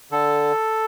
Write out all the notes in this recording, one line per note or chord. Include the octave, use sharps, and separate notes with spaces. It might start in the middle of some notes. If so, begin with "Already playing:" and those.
D3 A4